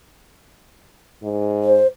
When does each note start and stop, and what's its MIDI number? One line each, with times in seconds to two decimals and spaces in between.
1.23 1.81 44
1.63 1.87 72